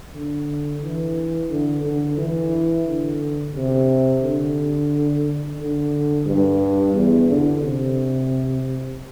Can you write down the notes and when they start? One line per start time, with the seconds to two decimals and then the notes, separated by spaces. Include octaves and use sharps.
0.14 D3
0.81 E3
1.50 D3
1.83 D3
2.17 E3
2.86 D3
3.54 C3
4.22 D3
5.59 D3
6.26 G2
6.94 E2
7.28 D3
7.63 C3